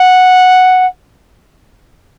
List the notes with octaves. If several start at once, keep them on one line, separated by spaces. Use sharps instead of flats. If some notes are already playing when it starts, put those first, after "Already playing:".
Already playing: F#5